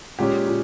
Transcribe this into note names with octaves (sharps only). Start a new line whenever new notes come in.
A#2 G#3 C#4 G4
A#2